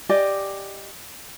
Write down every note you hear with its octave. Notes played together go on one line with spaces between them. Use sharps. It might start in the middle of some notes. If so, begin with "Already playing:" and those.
G4 D5 D#5 G#5